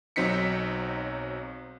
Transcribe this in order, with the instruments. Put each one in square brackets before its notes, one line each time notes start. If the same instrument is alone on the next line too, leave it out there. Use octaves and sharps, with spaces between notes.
[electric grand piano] B1 F#3 C4 D#4 B6 C#7